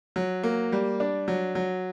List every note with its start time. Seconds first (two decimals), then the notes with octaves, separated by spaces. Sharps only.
0.16 F#3
0.43 A#3
0.72 G3
1.00 D4
1.28 F#3
1.55 F#3